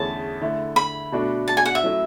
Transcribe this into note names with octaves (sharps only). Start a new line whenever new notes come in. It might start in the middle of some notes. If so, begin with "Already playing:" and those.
Already playing: E2 D3 A3 C#4 G#4 A5
D3 A3 E4
B5
B2 A3 D4 F#4
A5
G#5
F#5
E5
F#3 A3 C#4 E4